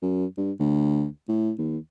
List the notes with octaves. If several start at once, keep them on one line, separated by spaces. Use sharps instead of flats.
F#2
G2
D2
A2
D#2